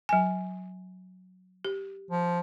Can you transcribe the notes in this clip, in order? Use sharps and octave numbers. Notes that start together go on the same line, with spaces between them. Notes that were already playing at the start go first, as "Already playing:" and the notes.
F#3 G#5
G4
F3